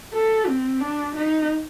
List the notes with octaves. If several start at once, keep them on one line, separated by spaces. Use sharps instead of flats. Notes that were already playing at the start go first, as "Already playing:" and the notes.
A4
C4
D4
D#4